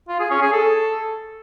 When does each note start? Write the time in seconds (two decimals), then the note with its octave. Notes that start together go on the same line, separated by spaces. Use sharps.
0.08 F4
0.19 G#4
0.30 C#4
0.41 G#4
0.52 A4